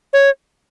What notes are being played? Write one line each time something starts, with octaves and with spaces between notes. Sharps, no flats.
C#5